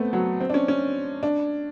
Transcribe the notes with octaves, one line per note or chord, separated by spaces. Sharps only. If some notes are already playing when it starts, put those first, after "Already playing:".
Already playing: A3 B3 C4
F#3
C4
D4
C#4
C#4
D4